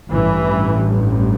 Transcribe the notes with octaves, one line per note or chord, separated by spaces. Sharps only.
A1 G2 E3